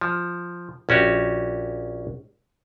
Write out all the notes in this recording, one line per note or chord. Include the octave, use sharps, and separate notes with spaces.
F3
A#1 C#4 F#4 G4